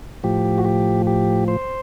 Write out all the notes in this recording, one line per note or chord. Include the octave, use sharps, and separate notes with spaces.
A2 F3 G4
F#4
G4
G4
C5